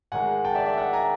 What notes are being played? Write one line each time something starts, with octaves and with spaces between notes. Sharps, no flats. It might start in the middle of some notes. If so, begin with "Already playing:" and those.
G#2 D#3 G#3 F#5 G#5
G5 A5
D5 E5
D5 E5
E5 F#5
G#5 A#5